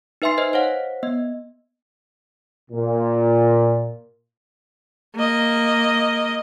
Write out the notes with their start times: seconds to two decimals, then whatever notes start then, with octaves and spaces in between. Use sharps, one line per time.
0.22 D#4 B4 E5 G#5 C6 C7
0.38 B4 C5 D#5
0.53 C5 C#5 F5 F#5
1.03 B3 D#5
2.71 A#2
5.16 A#3 D#5